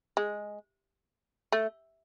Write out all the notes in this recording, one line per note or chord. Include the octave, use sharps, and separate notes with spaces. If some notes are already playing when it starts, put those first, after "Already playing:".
G#3
A3